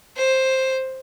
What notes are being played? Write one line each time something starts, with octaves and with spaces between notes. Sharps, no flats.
C5